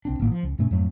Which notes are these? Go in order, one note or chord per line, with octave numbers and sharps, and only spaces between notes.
C2 C4 D4
G#1 A2 A#3 B3
F3
C#2
G2 B2 A3 C#4
F2 G#2 F#3 A3